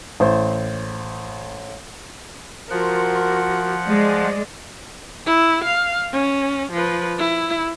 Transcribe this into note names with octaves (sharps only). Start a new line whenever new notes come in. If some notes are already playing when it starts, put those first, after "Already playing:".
A1 C5
F3 F4 F#4 A#4 F#5
G#3 D5
E4
F5
C#4
F3 B4
E4